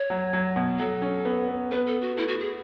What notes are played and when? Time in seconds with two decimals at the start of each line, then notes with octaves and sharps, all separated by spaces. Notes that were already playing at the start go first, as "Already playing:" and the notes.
Already playing: C#5
0.10 F#3
0.33 F#3
0.56 B2
0.79 F#3 A4
1.02 C#4
1.25 B3
1.48 B3
1.71 B3 B4
1.87 A4
2.02 F#4
2.17 A3 E4
2.28 F#4
2.40 G#4